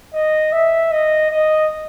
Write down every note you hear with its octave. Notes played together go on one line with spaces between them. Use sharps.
D#5
E5
D#5
D#5